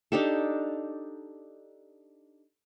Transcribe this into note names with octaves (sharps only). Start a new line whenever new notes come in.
D4 D#4 G4 A4